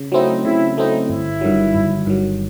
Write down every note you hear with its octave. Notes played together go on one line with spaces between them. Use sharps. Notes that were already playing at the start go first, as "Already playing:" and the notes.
Already playing: C#3
F#3 A3 C4 D#4 E4
C#3 E4
F#3 A3 C4 D#4 E4
G1 E4
G2 D#3 F#3
G1
G2 D#3 F#3